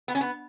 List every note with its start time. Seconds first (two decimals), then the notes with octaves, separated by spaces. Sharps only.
0.08 B3
0.15 C#4
0.21 B3